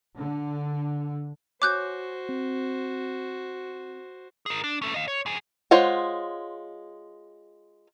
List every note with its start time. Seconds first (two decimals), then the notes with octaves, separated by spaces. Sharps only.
0.16 D3
1.62 F#4 C5 C#5 G#5 D6 F#6 G6
2.29 C4
4.46 G#4 A#4
4.64 D4
4.82 C#4 A4
4.94 D#5 F5
5.08 C#5
5.26 F2 G#4
5.71 G#3 F4 C5 C#5 F#5